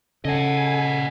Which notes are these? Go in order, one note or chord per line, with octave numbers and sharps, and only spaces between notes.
C#3 A4 D#5 F#5 G#5